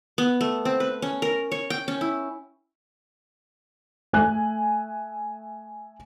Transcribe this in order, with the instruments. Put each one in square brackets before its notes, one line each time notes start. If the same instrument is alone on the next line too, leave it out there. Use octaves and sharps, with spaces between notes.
[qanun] B3
A3
C4
B4
C#4
A#4
C#5
G5
C#4
E4
[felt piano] A3 G#5 F#6